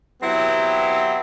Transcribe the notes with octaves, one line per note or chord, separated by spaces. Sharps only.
F#3 B3 C4 E4 G4